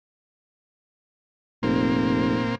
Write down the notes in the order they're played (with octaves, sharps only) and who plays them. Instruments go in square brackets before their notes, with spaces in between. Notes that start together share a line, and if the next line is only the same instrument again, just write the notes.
[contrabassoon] F1 [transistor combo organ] A#2 A#3 C4